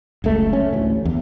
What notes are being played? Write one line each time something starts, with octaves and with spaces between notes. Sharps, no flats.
F#1 C#2 A3
C#4
A1 D2
E2